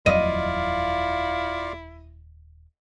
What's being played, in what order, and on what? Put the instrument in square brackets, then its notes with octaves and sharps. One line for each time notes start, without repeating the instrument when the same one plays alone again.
[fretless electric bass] D#1 F2 F#3 [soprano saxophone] E4 [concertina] F4 D5 F5 [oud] D#5